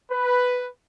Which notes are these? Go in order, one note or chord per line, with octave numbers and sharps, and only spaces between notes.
B4